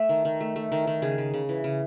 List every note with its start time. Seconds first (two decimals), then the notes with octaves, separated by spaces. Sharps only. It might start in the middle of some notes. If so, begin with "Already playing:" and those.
Already playing: A3 E5
0.09 D#3
0.25 D#3
0.41 A3
0.56 A3
0.72 D#3
0.87 D#3
1.02 C#3 G#4
1.18 C#3
1.34 C#3
1.49 E3
1.64 C#3